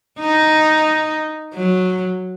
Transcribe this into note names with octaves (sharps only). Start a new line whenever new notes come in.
D#4
F#3